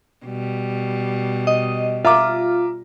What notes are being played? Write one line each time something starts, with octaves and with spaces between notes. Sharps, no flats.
B2 G3
D#5
F4 E5 A#5 D6